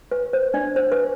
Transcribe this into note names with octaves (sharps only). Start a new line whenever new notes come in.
B4
C5
D4 D5
C5
B4